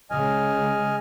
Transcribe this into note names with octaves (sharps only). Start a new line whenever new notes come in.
C#3 G#3 D#5 G#5 F6